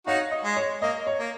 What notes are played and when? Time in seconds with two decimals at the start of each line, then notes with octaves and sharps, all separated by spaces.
0.07 D#4 F#4 C#5 F5
0.32 D#5
0.44 G#3
0.56 C#5
0.82 A#3 D#5
1.07 C#5
1.19 A#3